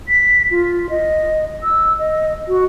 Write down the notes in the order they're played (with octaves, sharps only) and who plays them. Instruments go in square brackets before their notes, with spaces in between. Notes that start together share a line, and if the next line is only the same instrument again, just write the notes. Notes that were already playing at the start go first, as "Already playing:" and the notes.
[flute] B6
F4
D#5
E6
D#5
F#4